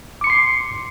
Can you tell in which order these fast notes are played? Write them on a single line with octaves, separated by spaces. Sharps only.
D6 C#7 C6 C7